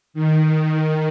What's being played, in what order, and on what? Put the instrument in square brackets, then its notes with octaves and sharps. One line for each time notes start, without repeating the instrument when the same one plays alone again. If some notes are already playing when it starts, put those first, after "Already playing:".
[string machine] D#3